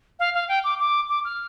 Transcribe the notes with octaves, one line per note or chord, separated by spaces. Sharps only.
F5
F5
G5
D6
D6
D6
F6